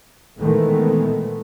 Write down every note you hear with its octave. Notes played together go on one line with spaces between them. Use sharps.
A#2 D#3 E3 G#3 A3 B3